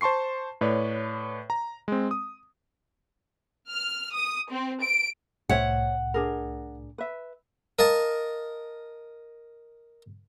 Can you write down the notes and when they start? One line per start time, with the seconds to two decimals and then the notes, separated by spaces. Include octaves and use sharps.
0.01 C5 A5 C6 C#6 C7
0.61 A2 B4 C#5 D5
1.50 A#5
1.88 G#3 C4
2.11 D#6
3.69 F6
4.13 D#6
4.49 C4
4.81 D7
5.49 C2 A2 C5 C#5 E5 F#5
6.14 D4 G#4 A#4
6.98 B4 E5
7.79 A#4 D#5 F5 A5